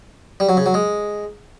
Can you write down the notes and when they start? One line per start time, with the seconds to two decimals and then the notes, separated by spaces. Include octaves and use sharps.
0.40 G3
0.49 F#3
0.57 C#3
0.66 F#3
0.74 G#3